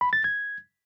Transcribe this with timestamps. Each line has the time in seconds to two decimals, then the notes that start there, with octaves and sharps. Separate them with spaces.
0.01 B5
0.13 A6
0.24 G#6